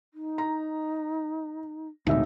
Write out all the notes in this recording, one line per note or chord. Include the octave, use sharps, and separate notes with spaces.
D#4
A#5
E1 D2 A2 C4 D#4 E5